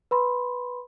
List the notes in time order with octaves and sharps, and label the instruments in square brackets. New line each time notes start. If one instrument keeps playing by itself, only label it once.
[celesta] B4 B5 C6